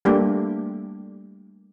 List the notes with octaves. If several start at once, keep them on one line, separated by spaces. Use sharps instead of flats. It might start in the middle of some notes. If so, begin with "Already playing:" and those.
G3 A3 A#3 D4 G4